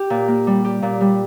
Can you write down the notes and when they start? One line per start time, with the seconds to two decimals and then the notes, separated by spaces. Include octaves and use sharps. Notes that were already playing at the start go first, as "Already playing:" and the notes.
Already playing: G4
0.10 A#2
0.28 A#3
0.47 G3
0.65 G4
0.82 A#2
1.01 G3